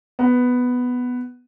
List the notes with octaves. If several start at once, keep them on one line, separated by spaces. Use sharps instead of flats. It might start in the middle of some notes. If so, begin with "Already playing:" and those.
B3